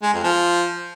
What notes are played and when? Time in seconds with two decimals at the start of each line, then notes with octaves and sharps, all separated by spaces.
0.03 G#3
0.13 F2
0.24 F3